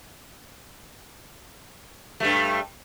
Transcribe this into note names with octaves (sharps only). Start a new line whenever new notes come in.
G2 G3 A3